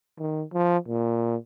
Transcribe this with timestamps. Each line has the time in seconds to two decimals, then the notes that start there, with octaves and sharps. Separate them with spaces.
0.19 D#3
0.53 F3
0.88 A#2